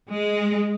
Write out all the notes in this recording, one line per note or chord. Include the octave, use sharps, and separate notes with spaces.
G#3